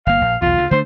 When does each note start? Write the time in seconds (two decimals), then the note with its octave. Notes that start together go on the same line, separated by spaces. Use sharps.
0.07 G1 A#3 F5
0.21 A#1
0.42 B1 E2 F4
0.58 D2 C#3
0.71 D3 A3 D4 C5